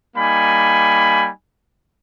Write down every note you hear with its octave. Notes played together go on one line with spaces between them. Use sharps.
G3 A#3 D#4 G#5 B5